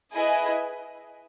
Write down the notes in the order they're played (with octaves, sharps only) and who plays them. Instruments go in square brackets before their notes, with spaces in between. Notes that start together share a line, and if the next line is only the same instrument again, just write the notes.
[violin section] E4 G#4 B4 D#5 G#5